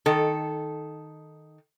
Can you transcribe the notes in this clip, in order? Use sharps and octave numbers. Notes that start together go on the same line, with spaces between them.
D#3 A4